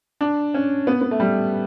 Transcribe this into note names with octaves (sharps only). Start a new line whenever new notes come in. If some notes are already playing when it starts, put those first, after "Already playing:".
D4
C#4
B3
B3
A3
G3